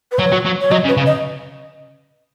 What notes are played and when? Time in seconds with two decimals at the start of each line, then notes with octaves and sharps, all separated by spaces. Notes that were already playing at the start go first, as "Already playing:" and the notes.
0.12 B4
0.18 F#3 C#5
0.32 F#3
0.45 F#3
0.61 C#5
0.71 F#3 D#5
0.84 C#3
0.88 B4
0.97 C#3
1.06 D#5